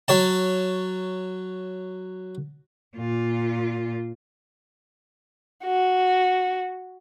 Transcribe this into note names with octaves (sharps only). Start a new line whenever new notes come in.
F#3 C#5 A5
A#2 F4
F#4